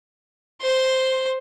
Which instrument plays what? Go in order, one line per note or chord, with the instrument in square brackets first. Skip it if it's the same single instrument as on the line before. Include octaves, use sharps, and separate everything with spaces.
[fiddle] C5 C6